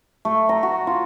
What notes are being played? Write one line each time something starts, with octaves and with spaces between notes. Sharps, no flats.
A3
A#5
F#4
F4